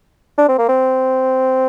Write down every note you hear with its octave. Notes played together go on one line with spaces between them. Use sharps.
D4
C4
A#3
C4